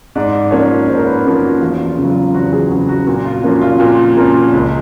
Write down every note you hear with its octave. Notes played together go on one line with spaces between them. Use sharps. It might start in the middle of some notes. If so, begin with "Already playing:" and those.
G#2 D5
F3 A#3 C#4 C#5
G#2 C5
A#4
B4
F3 A#3 C#4
F#4
E2 F4
F4
C#3
F#3
F4
E2 F#4
G#4
C#3 F#3 F#4
F#4
A#2 F#4
F4
F3 A#3 C#4 F#4
F4
A#2 F#4
F3 A#3 C#4 A#4
C#2